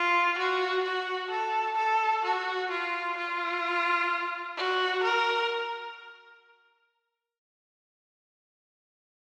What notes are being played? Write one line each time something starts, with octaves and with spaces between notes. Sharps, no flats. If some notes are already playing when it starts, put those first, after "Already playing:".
Already playing: F4
F#4
F#4
A4
A4
F#4
F4
F4
F#4
A#4